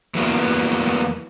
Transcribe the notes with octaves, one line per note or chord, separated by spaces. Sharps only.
E2 E3 F#3 A#3 B3 E4